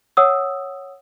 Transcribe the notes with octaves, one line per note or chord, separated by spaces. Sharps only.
C#5 F#5 D#6 E6